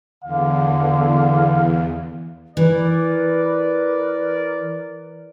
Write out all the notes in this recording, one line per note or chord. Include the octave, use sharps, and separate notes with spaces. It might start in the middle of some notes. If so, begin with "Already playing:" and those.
E2 D3 F5
E3 A#4 B4 D5